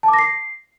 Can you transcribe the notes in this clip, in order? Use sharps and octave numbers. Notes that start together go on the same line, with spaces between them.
A5
D6
A#6
C7